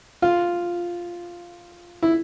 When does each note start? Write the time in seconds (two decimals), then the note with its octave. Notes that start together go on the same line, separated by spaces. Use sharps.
0.22 F4
2.03 E4